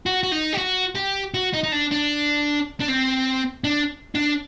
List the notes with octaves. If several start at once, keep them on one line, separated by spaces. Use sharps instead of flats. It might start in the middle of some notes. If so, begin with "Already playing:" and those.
F#4
F#4
D#4
G4
F#4
G4
F#4
D#4
D#4
D4
D4
D4
C4
D4
D4